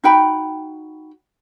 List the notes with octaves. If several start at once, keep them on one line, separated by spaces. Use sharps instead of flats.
D#4 F#4 G5 B5